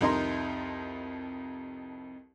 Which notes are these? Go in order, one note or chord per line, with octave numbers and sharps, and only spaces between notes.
C2 F2 D#4 A#4 C6